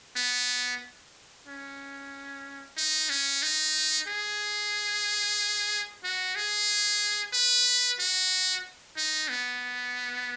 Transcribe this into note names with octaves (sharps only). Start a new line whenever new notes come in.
B3
C#4
D#4
C#4
D#4
G#4
F#4
G#4
B4
F#4
D#4
B3